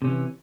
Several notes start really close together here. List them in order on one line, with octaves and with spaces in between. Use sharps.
C3 C#4 E3